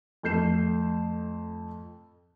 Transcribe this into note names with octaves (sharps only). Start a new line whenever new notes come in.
F2 A3 G6 C7 E7